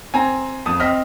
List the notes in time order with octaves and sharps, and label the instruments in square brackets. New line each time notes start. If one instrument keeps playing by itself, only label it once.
[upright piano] C4 [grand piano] G#5 A#5
[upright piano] F2 A5 D#6
[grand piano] C4 D#5 B6 [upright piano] F6